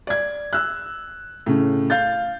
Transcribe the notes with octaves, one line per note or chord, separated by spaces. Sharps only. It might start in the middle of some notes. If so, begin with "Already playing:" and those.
D5 G#6
E6 F#6
A2 C#3
F5 G6 A6